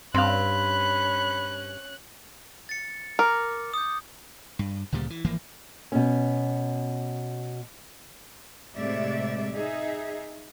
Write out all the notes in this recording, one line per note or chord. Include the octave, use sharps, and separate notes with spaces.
G2 C4 C#4 F5 B5 F#6
A6 C#7
A#4 D6
D#6 G6
G2
D2 A#2 C#3 G3
E3
G#1 E3 F3 A#3
B2 C#4
A2 C3 G#3 D5 E5
D#4 G#4 E5